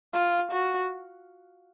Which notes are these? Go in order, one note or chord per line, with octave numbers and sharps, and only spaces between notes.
F4
F#4